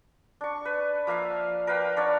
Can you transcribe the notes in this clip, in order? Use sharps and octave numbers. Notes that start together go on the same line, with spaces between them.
D4 C#6
B4
F3 A#3 E5 F5
A#4 B4 F5 G5
D4 C#5 D5 F#5